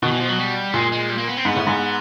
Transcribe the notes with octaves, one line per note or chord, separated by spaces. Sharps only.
B2 D#3
E3
F3
F#3
G3
A#2 G#3
G#3
G3
A#3
B3
C4
G#2 B3
A2
G#2